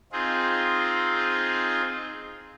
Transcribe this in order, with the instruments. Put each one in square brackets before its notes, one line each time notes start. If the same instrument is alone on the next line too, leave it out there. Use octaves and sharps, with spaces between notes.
[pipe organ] C4 D#4 F4 G#4